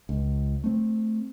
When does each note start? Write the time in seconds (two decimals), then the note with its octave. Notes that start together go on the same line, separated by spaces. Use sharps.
0.09 C#2
0.64 A3 C4